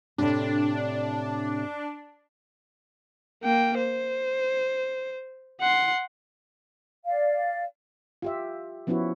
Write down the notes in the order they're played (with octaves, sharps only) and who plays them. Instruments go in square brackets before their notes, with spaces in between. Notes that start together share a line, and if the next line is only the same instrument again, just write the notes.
[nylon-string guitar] A2 C3 [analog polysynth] D4
[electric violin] A#3 G5
C5
F#5 C6
[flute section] D5 F5
[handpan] F4 G4 E5
F3 B3 C#4 E4 F#4